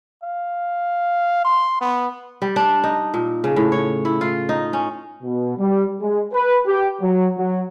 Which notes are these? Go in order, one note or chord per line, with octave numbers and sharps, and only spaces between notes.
F5
C6
B3
G3
D4
D#4
A#2
C#3
A2
C#5
E4
F4
D#4
C#4
B2
G3
G#3
B4
G4
F#3
F#3